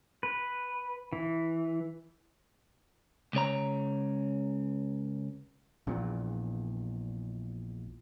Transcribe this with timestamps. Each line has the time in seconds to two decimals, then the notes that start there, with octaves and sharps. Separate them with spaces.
0.23 B4
1.13 E3
3.33 C#2 C#3 C#5 A#5
5.87 A#1 E2 A#2